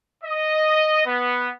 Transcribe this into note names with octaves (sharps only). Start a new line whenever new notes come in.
D#5
B3